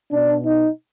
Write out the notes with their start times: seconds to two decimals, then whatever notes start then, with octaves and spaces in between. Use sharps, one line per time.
0.12 B2 D4
0.45 D#4